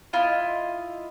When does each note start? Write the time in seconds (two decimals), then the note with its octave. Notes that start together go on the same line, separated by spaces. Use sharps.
0.13 E4 F4 D#5